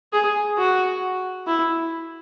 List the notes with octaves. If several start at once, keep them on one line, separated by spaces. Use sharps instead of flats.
G#4
F#4
E4